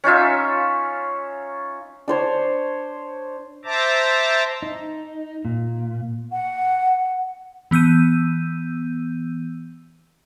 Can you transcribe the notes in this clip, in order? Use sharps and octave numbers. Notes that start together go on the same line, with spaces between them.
C#4 D#4 F4 E5
D4 C5 C#5
C5 E5 A5 A#5 D6
D#4
A#2
F#5
E3 B3 E6 G6 D#7